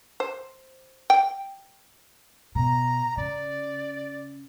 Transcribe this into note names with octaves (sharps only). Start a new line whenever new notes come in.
C5
G5
B2 A#5
C#3 D5